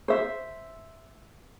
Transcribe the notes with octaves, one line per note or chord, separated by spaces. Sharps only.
C5 E5